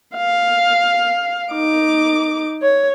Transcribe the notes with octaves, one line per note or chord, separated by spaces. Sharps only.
F5
D#4 D6
C#5